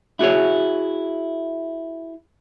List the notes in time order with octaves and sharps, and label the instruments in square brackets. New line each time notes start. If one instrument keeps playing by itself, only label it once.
[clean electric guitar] E4 F#4 G#4 C#5